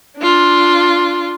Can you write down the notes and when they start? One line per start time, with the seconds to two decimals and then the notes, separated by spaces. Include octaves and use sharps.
0.18 D4 F4